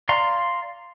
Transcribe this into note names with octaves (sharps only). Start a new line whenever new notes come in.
D5 F5 A#5 C6